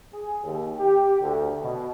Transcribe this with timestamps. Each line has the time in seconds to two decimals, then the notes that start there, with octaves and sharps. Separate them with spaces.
0.14 G#4
0.44 D#2
0.79 G4
1.21 D2
1.63 B2